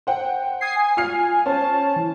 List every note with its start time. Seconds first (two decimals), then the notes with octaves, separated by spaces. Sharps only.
0.07 C5 F#5 G5
0.61 D#6 G#6 C7
0.76 G#5
0.97 F4 F6 C7
1.46 C#4 C5 A5
1.96 E3